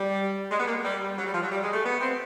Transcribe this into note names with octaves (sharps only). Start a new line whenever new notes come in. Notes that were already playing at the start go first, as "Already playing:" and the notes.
Already playing: G3
G#3
B3
A#3
G3
G3
F#3
G3
F3
F#3
G3
G#3
A3
B3
C4